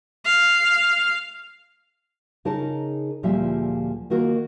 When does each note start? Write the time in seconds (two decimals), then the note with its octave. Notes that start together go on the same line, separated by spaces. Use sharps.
0.25 F5
2.45 C#3 D#4 G#4 A#4 C#5 A5
3.23 D2 A#2 F3 G3 G#4 E5
4.10 D#3 A#3 F#4 A#4